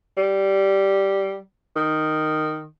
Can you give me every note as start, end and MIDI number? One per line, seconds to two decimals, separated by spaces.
0.18 1.37 55
1.76 2.65 51